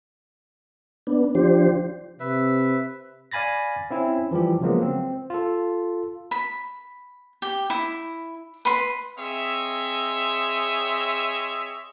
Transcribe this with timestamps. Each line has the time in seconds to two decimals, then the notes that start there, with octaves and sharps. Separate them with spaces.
1.07 B3 D4
1.35 F3 D4 G4 C5
2.20 C3 B4 E5
3.31 D5 F5 G#5 B5 A6 A#6
3.91 C4 C#4 E4
4.31 E3 F3 G3 G4
4.61 C#3 F3 F#3 G#3 A#3 B3
4.82 C4
5.30 F4 A4
6.31 B5
7.42 G4
7.70 E4
8.65 B4 B5 C6
9.18 C4 G#4 C#5 D#5 E5